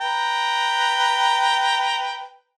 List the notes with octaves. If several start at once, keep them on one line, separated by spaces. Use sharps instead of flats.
B4 G5 A#5